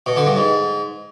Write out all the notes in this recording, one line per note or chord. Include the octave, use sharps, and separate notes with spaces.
B2
D3
G2
G#2